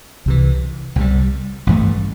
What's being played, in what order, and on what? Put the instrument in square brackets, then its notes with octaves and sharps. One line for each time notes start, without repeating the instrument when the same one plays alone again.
[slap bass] C2 C3 E3
C2 C3 G3
A1 G2 E3 A3